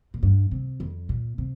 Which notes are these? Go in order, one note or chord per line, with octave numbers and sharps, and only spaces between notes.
A#2
G2
C3
F2
A#2
C3